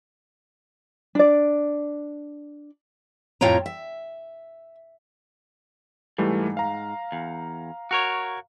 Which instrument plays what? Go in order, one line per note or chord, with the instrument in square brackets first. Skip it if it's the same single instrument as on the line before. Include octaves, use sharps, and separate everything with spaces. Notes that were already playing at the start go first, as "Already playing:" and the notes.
[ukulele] D4 D5
[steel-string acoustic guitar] F2 A2 F4 C#5 G5 A#5
E5
[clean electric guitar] G#2 [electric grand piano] E3 G3 A3
[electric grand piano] F5 A#5
[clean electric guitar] E2
F#4 A#4 C#5